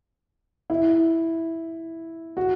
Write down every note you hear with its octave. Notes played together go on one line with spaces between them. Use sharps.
E4
F#4